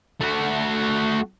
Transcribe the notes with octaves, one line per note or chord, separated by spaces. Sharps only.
A3 F#4